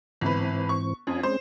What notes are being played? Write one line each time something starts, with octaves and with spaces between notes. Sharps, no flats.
G1 G#2 E3 C4 B4
C#6
F2 C#4 F4 G#5
G#3 C4 C#4 C5